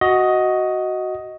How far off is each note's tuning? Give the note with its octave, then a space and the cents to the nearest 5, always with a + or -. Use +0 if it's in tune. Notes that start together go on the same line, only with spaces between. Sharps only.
F#4 +5 D#5 +10